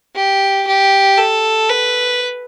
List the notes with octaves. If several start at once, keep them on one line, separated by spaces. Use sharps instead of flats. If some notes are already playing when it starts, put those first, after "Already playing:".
G4
G4
A4
B4